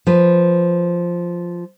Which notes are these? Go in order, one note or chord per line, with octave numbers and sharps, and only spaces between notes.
F3 B4